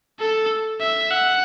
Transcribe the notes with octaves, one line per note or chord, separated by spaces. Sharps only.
A4
E5
F#5